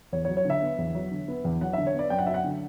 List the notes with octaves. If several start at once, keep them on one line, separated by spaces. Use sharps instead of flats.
E2 C#5
C#5
F#3
C#5
D3
E5
B3
E2
F#3
D3
B3
E2
F#3 F#5
D3 E5
C#5
B3 D5
F#2 G5
F#5
F#3 E5
F#5
D3